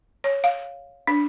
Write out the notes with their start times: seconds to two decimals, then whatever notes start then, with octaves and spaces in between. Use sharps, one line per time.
0.24 C#5
0.44 F5
1.07 D4